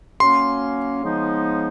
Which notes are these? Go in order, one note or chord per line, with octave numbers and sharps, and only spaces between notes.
F#3 A#3 C#4 C6
C#3 F3 G#3 B3 D#4